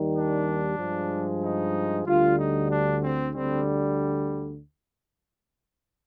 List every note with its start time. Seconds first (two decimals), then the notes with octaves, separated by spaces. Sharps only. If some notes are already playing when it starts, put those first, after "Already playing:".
Already playing: D#2 D#3 G3
0.15 D4
0.78 G2 F3 G#3
1.43 D#4
2.06 D2 D3 G3 F4
2.37 D#4
2.69 D4
3.01 C4
3.33 D2 D3 G3 C4